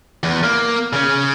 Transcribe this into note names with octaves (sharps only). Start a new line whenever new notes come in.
E2
A#3
C#3 C#4